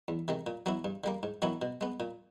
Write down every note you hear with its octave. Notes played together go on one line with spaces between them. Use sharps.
E2
C3 D#3 G#3
A#2
F#3 B3 E4
G2
D3 G3 A#3
G#2
D#3 F#3 B3 E4
B2
G#3 B3
A#2